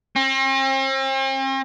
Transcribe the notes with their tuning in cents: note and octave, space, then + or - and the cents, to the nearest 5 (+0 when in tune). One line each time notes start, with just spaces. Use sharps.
C4 +45